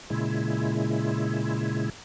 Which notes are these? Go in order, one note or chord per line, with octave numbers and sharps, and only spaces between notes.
A#2 C#3 G#3 E4